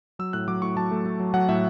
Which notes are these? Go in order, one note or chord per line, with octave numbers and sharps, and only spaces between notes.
F#3 E6
A2 F#6
F#3 D6
A2 C#6
F#3 A5
A3
A3
F#3
F#3 F#5
A2 E5